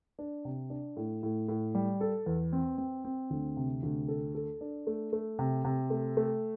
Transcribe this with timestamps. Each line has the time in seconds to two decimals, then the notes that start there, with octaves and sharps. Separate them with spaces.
0.19 D4
0.45 C3
0.70 D4
0.97 A2
1.23 A2
1.48 A2
1.75 G3
2.01 A4
2.26 E2
2.53 C4
2.78 C4
3.04 C4
3.30 D2
3.57 C3
3.83 D2
4.08 A4
4.35 A4
4.61 D4
4.87 A3
5.13 A3
5.39 C3
5.64 C3
5.90 A3
6.17 A3